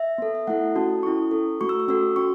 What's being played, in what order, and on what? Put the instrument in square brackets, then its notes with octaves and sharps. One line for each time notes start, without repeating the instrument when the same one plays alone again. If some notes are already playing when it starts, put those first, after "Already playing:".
Already playing: [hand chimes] E5
B3 A4
E5
A3 E4 A4 F#5
C#4 F#4 A4 A5
C#4 E4 A4 C#6
C#4 A4
A3 F#4 A4 C#6
E6
C#6
C#4 F#4 A4 E6
C#4 F#4 C#6